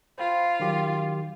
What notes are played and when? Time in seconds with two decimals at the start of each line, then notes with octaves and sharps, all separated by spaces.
0.18 F4 C5 G5 B5
0.60 D#3 F#3 G4